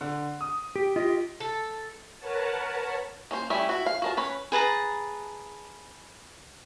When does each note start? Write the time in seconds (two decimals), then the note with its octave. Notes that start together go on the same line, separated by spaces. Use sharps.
0.01 D3
0.41 D#6
0.76 G4
0.96 F4 G4 D#5
1.40 A4
2.19 A#4 B4 C#5 F#5 A5
3.31 A#3 C#4 C5
3.50 G3 A3 C#4 E4
3.69 E4 F#4
3.86 F5
4.02 F#4 A#4 A5
4.17 C#4 B4 C#5
4.52 G#4 B4 A5 A#5